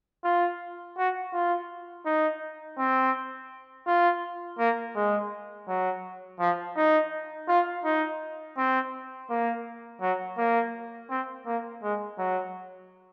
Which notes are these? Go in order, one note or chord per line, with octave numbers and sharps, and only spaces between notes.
F4
F#4
F4
D#4
C4
F4
A#3
G#3
F#3
F3
D#4
F4
D#4
C4
A#3
F#3
A#3
C4
A#3
G#3
F#3